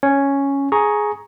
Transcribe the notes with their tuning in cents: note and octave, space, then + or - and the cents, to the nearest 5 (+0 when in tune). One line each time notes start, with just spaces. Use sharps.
C#4 +0 C#5 +0
G#4 +10 A#5 +5 C#6 +0